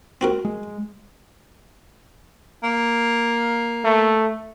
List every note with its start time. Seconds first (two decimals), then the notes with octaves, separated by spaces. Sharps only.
0.21 C4 F#4 A#4
0.45 G#3
2.63 A#3
3.85 A3